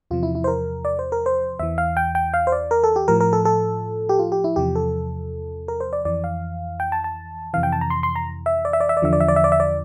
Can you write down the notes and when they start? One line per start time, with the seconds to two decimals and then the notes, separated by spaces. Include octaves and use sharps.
0.11 E2 C3 F3 F4
0.23 E4
0.35 E4
0.44 C5
0.48 A#4
0.85 D5
0.99 C5
1.12 A#4
1.26 C5
1.59 E2 E3 E5
1.78 F5
1.97 G5
2.15 G5
2.34 F5
2.47 C5
2.52 D5
2.71 A#4
2.84 A4
2.96 G4
3.08 A2 F3 A#4
3.20 A#4
3.33 A4
3.45 A4
4.09 G4
4.19 F4
4.32 G4
4.44 E4
4.56 E2 C3 F3 G4
4.76 A4
5.68 A#4
5.80 C5
5.93 D5
6.05 F2 E3 D5
6.24 F5
6.80 G5
6.92 A5
7.04 A5
7.54 F2 C3 E3 F5
7.63 G5
7.72 A5
7.81 A#5
7.90 C6
8.03 C6
8.16 A#5
8.46 E5
8.65 D5
8.73 E5
8.80 D5
8.89 E5
8.97 D5
9.02 E2 D3 F3 E5
9.13 D5
9.20 E5
9.28 D5
9.36 E5
9.44 D5
9.52 E5
9.60 D5